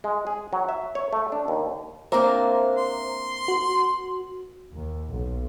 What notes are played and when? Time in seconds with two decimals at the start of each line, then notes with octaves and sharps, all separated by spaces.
0.04 G#3
0.27 G#4
0.53 F#3
0.69 E5
0.95 C#5
1.13 A3
1.32 D4
1.48 D#2
2.12 A#3 C4 D4 C5 E5 A#5
2.77 C6
3.48 F#4
4.73 D#2
5.08 B1